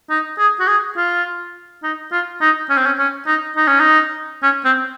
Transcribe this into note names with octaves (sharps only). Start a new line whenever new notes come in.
D#4
G#4
F#4
G#4
F4
D#4
F4
D#4
C#4
C4
C#4
C#4
D#4
D#4
C#4
D#4
C#4
C4